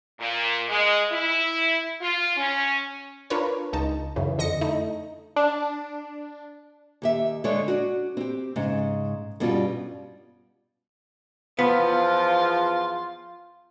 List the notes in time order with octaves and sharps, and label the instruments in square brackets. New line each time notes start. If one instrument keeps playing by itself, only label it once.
[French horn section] A#2
G#3
E4
F4
C#4
[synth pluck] D4 F4 A#4 B4 C#5
C#2 D#4 A5
F#2 C#3 E3
F2 D3 D#5 A#6 C#7
A3 D#4 E4
[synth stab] D4
[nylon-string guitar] D#2 G4 E5
D3 G#3 D4 A4 C#5
D4 F#4
C4 G4
G#2 C#3
G2 B2 G3 C#4 F4
[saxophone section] E2 F3 [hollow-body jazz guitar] B3 [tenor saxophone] F4